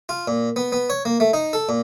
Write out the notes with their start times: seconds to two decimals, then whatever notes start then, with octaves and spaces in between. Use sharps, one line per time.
0.09 F4
0.28 A#2
0.56 B3
0.72 B3
0.90 C#5
1.05 A#3
1.20 A3
1.33 D#4
1.53 A4
1.69 A#2